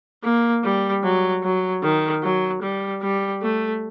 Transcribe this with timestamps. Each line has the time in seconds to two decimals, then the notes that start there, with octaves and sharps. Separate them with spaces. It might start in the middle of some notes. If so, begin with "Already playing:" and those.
0.24 A#3
0.63 G3
1.03 F#3
1.43 F#3
1.83 D#3
2.23 F#3
2.62 G3
3.02 G3
3.42 A3